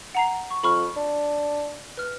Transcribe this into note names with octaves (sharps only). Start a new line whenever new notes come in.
F#5 A#5 C7
C#6
F2 B5 C#6 F6
D4
B4 F6